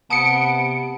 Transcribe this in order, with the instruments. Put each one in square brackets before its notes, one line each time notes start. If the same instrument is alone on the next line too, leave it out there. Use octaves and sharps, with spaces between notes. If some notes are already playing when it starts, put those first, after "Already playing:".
[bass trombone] C3 [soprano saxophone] B3 [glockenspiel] A5 D#6 [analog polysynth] C#7 D7